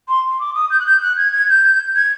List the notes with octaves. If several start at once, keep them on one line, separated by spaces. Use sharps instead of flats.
C6
D6
D#6
G6
F#6
G6
F#6
G#6
G#6
G6
G#6